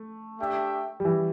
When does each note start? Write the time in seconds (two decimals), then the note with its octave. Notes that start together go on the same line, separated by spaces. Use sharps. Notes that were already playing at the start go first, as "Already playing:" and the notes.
Already playing: A3
0.39 A3 D4 G4 E5 G5
1.00 G3
1.05 E3